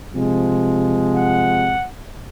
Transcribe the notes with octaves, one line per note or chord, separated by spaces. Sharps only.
C3 F3 G#3
F#5